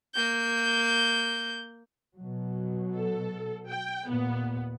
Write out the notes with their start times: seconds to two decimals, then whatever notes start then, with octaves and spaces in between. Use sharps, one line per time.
0.14 A#3 G6
2.16 B2 F#3
2.95 A4
3.69 G5
4.09 D#2 A#2 B3